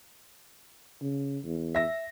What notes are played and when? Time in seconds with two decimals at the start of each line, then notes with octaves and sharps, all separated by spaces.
1.02 C#3
1.44 E2
1.75 E5 A#6